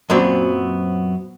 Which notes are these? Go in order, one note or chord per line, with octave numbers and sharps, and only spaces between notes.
F#2 A#2 F#3 B3 C4 D5